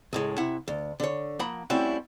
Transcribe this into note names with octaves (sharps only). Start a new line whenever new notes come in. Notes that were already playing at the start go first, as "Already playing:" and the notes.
C#2 A2 G#3
C3 E4 F#5
D2
D3 C#5
F3 A#3 F#5 B5
G3 A3 C4 C#4 E4 F#4